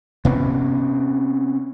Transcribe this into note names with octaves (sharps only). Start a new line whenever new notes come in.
C3 B3 C#4